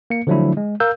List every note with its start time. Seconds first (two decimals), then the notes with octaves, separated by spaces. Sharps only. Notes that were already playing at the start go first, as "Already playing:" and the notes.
0.10 A#3 C#7
0.27 D3 F3 F#3 A3 D4 E4
0.57 G#3
0.80 A#4 F5 E6 G6